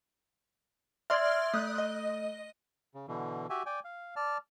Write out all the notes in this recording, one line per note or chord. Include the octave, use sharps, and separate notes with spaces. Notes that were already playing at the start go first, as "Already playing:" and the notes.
D5 E5 C6 F6 G#6
A3 D#6 F#6
D#5
C#3
B2 D3 E3
F#4 G4 E5 G#5
D5 G5 G#5
F5
D5 A5 F6